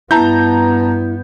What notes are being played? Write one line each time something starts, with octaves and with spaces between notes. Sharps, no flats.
G2 B3 E4 A5 A#5 G6